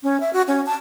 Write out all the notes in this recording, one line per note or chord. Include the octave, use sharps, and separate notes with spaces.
C#4
E5
F#4
C#4
A5